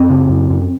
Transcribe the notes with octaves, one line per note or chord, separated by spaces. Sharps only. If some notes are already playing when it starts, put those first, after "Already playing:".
Already playing: F#2 C4
C#3
F#2
F#2